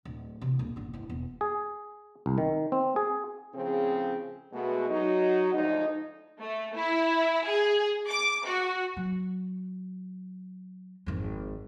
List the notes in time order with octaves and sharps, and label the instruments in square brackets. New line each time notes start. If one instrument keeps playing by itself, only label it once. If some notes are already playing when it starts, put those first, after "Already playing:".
[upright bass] D1
C3 E3
D1 A#3
G1 D3
D1 E4
E1 B3
[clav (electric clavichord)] G#4
C2
D#3
C4
G#4
[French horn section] A2 C#3 F3 C4 G#4
B2 G#3 A3 B3 F#4 A4
F#3 D#4 F#4
D2 G#2 F3 D#4
[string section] A3
E4
G#4
D6
F#4
[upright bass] F#3
G#1 F2